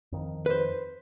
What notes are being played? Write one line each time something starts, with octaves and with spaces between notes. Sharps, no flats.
F2 D#3
B4 C5